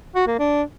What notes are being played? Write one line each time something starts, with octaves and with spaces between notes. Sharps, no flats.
F#4
A#3
D4